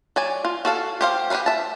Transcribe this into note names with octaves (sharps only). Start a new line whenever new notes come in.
F#3 D5 G#5
F4
F#4 A4 F5 A5
G4 C5 F5
G4 G#4 A#4 B4 F5
E5 A5